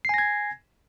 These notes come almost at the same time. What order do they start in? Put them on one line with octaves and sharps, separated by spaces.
C7 G#5 A#6 G#6